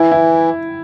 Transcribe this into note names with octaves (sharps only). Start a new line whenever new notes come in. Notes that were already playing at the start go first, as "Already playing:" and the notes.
Already playing: E3 E4
E4